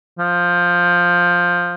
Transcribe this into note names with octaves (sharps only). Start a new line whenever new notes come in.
F3